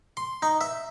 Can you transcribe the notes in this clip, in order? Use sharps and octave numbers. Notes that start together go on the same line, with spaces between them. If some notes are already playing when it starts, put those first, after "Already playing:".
C6
D#4
E5